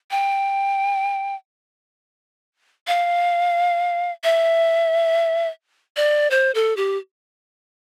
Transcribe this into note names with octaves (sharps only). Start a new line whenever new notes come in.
G5
F5
E5
D5
C5
A4
G4